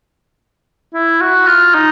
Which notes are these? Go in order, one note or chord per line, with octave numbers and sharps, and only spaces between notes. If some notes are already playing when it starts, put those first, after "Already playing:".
E4
F#4
F4
D#4